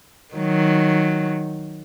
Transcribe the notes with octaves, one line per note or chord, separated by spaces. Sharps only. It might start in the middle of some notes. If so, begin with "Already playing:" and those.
D#3 F#3